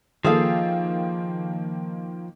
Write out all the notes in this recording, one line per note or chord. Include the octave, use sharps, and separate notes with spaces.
D#3 F3 A#3 G#4 A4 F5